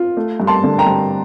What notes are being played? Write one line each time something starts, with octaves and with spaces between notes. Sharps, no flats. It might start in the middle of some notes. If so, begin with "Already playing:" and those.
Already playing: F4
A3
G2
A5 C6
D3
G5 A#5
G2